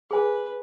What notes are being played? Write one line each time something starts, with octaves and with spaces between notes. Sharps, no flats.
G#4 B4 C5 G#5